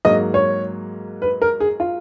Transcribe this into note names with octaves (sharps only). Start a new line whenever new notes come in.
G#2 F#3 A#3 D#5
C#5
B4
A#4
G#4
F4